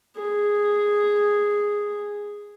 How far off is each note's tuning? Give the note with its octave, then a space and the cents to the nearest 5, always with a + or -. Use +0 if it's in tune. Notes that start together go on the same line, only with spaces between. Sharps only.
G#4 -5